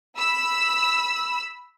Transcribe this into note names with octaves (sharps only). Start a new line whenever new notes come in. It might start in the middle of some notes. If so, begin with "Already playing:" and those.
B5 E6